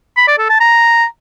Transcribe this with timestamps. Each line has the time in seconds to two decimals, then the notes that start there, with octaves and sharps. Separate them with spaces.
0.17 B5
0.28 D5
0.38 A4
0.49 A5
0.60 A#5